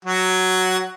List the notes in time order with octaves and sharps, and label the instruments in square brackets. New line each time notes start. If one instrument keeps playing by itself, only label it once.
[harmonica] F#3 F#4